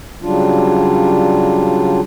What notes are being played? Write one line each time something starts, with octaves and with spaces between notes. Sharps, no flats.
C#3 F#3 G3 D4 F4